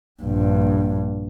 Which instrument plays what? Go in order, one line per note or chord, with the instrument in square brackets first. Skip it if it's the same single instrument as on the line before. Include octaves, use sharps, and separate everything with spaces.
[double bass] A#1 G2